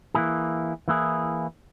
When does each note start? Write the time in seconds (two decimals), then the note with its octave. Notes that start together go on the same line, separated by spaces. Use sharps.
0.15 E3 A#3 E4 G#4
0.88 E3 A#3 E4 G#4